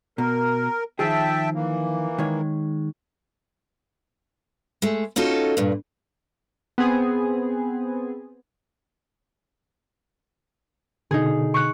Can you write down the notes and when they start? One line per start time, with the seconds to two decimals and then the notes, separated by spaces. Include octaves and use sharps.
0.18 B2 A#4
0.99 D#3 F3 G#4 E5 G5 A5
1.55 E3 A#3
2.18 D#3 G#3 C#5
4.82 G#3 A3
5.16 C#4 D#4 F4 F#4 A4
5.57 G2 A#2
6.78 B3 C4 G#4
11.11 B2 D3 D#4 G#4
11.54 C#6 F#6